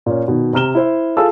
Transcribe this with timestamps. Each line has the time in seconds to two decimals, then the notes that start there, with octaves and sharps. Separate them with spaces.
0.06 A#2 C#4
0.28 B2 D#3
0.53 C3 A#5 F6 E7 G7
0.75 E4 C5 E5
1.17 F4 G#4 A4 F5 A5 E6